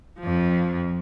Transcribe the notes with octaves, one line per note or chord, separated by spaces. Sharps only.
F2 F3